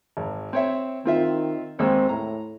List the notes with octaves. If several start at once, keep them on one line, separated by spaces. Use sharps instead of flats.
G#1
C4 C#5 E5
D#3 C4 F4 E5
D#2 G#3 C4 E6
A2 A#5